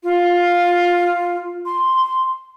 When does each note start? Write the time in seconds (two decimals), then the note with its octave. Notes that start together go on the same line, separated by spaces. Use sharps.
0.03 F4
1.65 C6